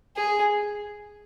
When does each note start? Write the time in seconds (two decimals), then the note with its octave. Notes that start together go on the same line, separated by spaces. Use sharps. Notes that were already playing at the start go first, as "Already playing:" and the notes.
0.17 G#4